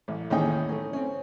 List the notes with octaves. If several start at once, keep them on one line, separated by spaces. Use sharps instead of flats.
A1
A1 D#2 C#4 D#4 G#4 G5
A3 C#4
C4 C#4